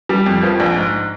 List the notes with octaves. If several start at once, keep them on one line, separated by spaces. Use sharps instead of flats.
G3
F2
F3
A#1
G#2